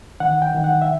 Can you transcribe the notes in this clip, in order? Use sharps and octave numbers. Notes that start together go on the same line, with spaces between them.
D#3 F#5
G5
D#3
F#5
E5